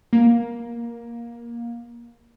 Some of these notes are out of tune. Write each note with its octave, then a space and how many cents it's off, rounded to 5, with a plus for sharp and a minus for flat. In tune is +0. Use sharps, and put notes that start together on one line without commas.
A#3 +15